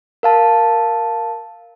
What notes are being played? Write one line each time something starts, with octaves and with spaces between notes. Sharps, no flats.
A#4 F5 A5